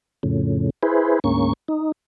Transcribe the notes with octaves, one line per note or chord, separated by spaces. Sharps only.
F2 A2 C#3
E4 G#4 B4 C5
D2 G#2 A#3 C#4 C#6
D#4